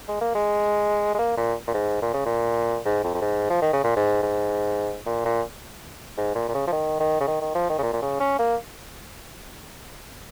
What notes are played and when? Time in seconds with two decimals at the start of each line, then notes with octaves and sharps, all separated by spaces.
0.08 G#3
0.21 A#3
0.35 G#3
1.14 G#3
1.19 A#3
1.37 A#2
1.68 A#2
1.74 G#2
2.02 A#2
2.14 C#3
2.26 A#2
2.85 G#2
3.04 F2
3.14 F2
3.22 G#2
3.50 F3
3.62 D#3
3.73 C#3
3.84 A#2
3.96 G#2
4.23 G#2
5.06 A#2
5.25 A#2
6.17 G#2
6.35 A#2
6.49 A#2
6.54 C#3
6.67 F3
6.72 D#3
7.00 D#3
7.20 C#3
7.27 D#3
7.41 D#3
7.55 F3
7.69 D#3
7.79 C#3
7.82 A#2
7.93 A#2
8.02 C#3
8.20 C#4
8.39 A#3